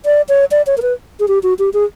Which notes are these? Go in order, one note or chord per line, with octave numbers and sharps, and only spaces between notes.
D5
C#5
D5
C#5
A#4
B4
G#4
G4
F#4
G4
G#4